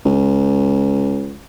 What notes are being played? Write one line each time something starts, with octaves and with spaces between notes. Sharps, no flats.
C#2